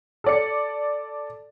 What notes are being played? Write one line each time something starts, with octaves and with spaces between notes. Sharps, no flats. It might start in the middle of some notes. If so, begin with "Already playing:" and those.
A4 D5 C#7